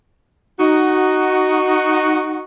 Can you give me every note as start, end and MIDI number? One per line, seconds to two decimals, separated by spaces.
0.59 2.44 63
0.59 2.44 66